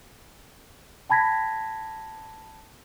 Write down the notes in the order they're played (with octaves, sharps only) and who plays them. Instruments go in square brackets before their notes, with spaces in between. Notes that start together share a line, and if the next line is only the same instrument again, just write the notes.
[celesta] G5 A5 B5 G#6 A#6 B6